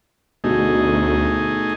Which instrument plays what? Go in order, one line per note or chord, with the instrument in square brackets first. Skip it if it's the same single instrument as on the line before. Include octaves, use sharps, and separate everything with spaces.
[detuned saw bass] D2 [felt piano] B2 F#4 [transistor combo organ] A3 D#4 G#4